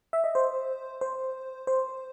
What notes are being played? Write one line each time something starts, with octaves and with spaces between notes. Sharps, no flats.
E5
D#5
C5
C5
C5